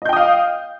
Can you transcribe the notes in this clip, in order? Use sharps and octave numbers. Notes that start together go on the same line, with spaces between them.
D#5 F5 G5 D#6 G6